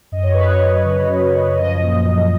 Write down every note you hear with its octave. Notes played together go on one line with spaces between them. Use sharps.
F#2 D#5
C#5
F#2 B4
C#5
F#2
C#3
F#2
F#2
F3 D#5
A#2
F3